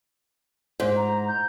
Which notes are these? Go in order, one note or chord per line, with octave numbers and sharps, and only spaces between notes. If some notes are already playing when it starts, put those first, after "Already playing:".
G#2
A#5
G6